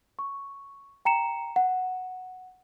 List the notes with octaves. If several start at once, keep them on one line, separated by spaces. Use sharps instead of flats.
C#6
G5 A#5 C#7 E7
F#5